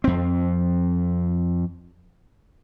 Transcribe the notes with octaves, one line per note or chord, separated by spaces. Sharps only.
F2 C4